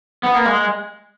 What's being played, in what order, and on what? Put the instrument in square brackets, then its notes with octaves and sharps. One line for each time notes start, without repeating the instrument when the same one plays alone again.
[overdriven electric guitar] B3
A#3
G#3